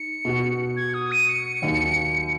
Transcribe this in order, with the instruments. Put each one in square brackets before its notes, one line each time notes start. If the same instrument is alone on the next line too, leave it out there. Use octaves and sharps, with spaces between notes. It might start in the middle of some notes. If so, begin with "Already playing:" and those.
Already playing: [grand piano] D#4 [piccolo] C#7
[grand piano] B2 B3 F#4
[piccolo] G#6
D#6
D#7
C#7
[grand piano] D#2 D#3 F#3